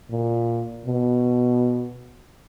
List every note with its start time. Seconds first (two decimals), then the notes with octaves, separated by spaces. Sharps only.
0.11 A#2
0.85 B2